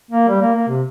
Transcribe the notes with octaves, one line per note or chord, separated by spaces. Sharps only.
A#3
G3
A#3
A#3
C3